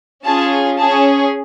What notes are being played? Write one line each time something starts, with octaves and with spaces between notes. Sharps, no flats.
C#4 F4 G#4 A5
C#4 G#4 A5